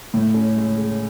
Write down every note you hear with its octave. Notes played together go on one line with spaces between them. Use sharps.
A2
C#4
G#3
G#4